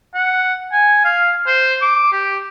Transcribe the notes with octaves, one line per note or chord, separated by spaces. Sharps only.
F#5
G#5
F5
C5
D6
G4